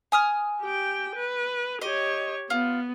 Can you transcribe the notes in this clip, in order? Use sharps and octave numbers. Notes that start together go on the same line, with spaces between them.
G#5 D#6 F6
G4 G5
B4
G4 C#5 D#5
B3 F4